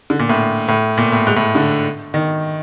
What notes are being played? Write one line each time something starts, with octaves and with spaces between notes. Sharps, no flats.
D3
A#2
A2
A2
A#2
A2
G#2
A2
D3
D#3